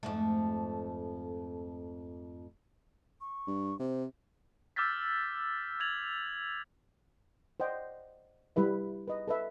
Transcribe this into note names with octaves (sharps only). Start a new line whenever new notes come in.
F2 G#2 A3
C#6
G2
C3 C5
D6 E6 F6 G6 A6 B6
G#6 A6 F7 F#7
C5 D5 D#5 F#5 G5
G3 E4 B4 E5
B4 D#5
A4 B4 E5